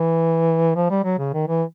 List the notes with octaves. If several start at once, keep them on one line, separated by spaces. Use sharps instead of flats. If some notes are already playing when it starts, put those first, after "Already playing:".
Already playing: E3
F3
G3
F#3
C#3
D#3
E3